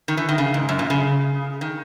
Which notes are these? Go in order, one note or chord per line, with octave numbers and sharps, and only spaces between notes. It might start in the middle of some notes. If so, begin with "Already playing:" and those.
D#3
E3
D#3
C#3
G#2
F#2
A#2
C#3
D#3